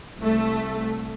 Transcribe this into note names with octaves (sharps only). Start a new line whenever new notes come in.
C2 A3